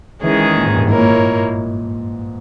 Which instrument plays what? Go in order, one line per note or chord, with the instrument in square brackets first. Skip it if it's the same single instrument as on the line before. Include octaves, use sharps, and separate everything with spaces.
[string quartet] D#3 G#3 C#4 G#4 [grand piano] E3
[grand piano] A#2
G#2
G2
[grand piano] G#2 [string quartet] A#3 E4 A#4 C#5
[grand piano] A#2
A#2